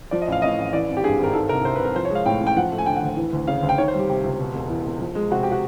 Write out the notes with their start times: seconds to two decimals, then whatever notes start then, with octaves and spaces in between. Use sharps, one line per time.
0.11 F3 D5
0.22 D#5
0.27 A1 F5
0.42 A2 D#5
0.58 A1
0.73 E3 D5
0.89 G#1
0.97 G4
1.04 G2 G#4
1.19 G#1 A#4
1.34 D#3 A4
1.49 C2 A#4
1.65 C3 C5
1.75 B4
1.79 C2
1.85 A#4
1.95 F3 C5
2.05 C#5
2.10 G#3
2.15 F5
2.26 A2 G5
2.41 A1
2.47 G5
2.57 F3 F#5
2.72 A3
2.78 G#5
2.86 D3 G5
2.96 F#5
3.03 D2
3.17 E3
3.33 D2
3.47 C#3 F5
3.63 D2
3.69 G5
3.78 D#3 C#5
3.88 C5
3.94 G3
3.99 G4
4.09 C3 G4
4.24 C#2
4.40 B2
4.54 E1
4.69 E2
4.85 E1
5.00 F3
5.15 G#3
5.30 C3 F#4
5.43 G4
5.52 F#4